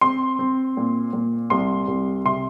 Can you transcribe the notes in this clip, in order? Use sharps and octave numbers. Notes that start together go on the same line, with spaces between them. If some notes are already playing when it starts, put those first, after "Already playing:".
C4 C6
C4
A#2
A#2
C2 C6
C2
C3 C6